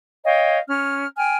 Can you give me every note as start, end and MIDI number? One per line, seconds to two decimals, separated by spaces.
0.24 0.58 73
0.24 0.58 75
0.24 0.58 77
0.24 0.58 79
0.68 1.05 61
0.68 1.05 89
1.17 1.37 79
1.17 1.37 80
1.17 1.37 89